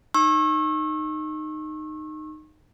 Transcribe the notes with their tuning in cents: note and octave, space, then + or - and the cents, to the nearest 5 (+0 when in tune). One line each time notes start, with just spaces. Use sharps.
D#4 -15 C#6 -35 E6 +0